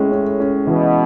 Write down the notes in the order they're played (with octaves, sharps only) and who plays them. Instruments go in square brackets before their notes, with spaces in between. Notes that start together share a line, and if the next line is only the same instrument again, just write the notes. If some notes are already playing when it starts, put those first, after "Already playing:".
Already playing: [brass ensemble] A2 [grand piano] G#3 C#4
[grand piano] C#4
C#4
[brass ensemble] B2 [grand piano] E3